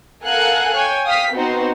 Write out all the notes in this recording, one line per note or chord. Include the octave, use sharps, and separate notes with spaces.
A4 A#4 F5 F#5 G#5 F#6
C#5 G5 G#5
F5 G5 D#6 F6 B6
B3 C4 D#4 F#4 B4 C5